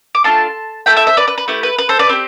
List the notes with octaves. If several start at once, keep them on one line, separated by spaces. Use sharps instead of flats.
D6
A3 D4 F4 A5 C6
A3 E4 A4 G5 B5
E5 G5
C5 E5
B4 D5
B4
B4
A3 E4 G4 B4
B4
B4
A4 C5
B4 D5
C4 G4